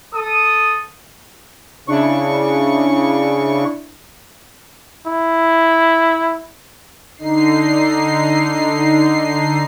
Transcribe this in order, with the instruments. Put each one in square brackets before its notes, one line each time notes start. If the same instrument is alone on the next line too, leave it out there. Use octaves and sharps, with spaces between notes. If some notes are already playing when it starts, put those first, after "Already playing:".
[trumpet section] A4 D#6
[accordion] C#3 C#6 [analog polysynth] D4 E4
[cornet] E4
[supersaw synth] D3 D#4 C7